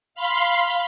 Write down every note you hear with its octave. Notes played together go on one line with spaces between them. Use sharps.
F5 B5 C6